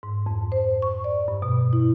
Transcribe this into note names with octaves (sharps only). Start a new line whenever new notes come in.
G#2
F2
C5
C#6
D5
G2
B2
E4